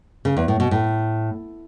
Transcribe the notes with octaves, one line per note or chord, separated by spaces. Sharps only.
C#3
E2
A2
B2
A2